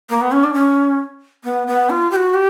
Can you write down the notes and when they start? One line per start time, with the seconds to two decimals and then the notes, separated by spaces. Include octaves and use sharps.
0.10 A#3
0.21 B3
0.32 C#4
0.44 D4
0.54 C#4
1.44 B3
1.67 B3
1.90 F4
2.11 G4
2.16 F#4
2.34 G4